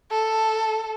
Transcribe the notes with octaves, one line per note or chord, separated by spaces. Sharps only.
A4